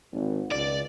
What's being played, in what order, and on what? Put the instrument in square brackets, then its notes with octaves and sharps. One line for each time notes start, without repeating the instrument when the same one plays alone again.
[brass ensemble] G#1
[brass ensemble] C#2 [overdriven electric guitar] D5